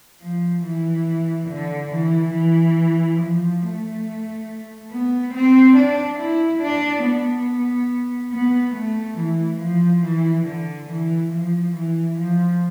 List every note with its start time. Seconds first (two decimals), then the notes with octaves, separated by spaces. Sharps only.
0.21 F3
0.63 E3
1.50 D3
1.93 E3
2.35 E3
3.21 F3
3.63 A3
4.92 B3
5.35 C4
5.77 D4
6.20 E4
6.62 D4
7.05 B3
8.33 B3
8.76 A3
9.18 E3
9.61 F3
10.04 E3
10.47 D3
10.89 E3
11.32 F3
11.75 E3
12.18 F3